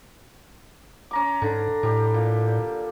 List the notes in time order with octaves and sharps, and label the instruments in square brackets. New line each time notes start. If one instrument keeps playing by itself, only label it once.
[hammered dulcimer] C#4 A#5 D6
[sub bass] G#2 [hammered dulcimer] D3 A#5
[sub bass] A2 [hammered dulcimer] G3 G4
[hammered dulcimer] A#2